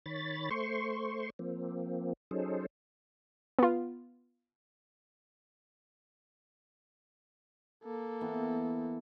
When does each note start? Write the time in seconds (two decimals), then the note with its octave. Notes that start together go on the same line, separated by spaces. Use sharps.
0.06 D#3 C#5 B5 A6
0.51 A3 C5 C6 C#6
1.39 F3 A#3 C4
2.31 F#3 C#4 D#4 G#4 A4 C5
3.59 B3 F4
7.84 A#3 A4
8.21 E3 B3